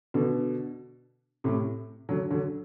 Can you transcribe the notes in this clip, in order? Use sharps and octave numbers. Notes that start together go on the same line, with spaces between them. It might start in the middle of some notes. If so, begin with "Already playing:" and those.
B2 D3
A2 C3
D3 F#3
D3 F#3